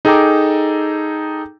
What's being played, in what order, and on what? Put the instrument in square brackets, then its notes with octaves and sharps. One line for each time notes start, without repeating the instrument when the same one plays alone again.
[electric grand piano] D#4 G#4 A4 G5 A#5 D6